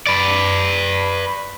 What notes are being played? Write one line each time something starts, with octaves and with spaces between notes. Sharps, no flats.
B4 D5